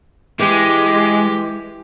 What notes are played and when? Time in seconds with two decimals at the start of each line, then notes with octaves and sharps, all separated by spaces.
0.39 E3 G#3 G4